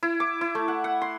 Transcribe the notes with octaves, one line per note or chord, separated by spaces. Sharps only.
E4
D6
E4
A3
F#5
F#5
C6